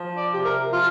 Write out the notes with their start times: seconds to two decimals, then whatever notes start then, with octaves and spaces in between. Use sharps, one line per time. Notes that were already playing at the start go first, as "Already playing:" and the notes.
Already playing: F3
0.17 D5
0.31 C3 G4
0.45 A#4
0.73 F3 F4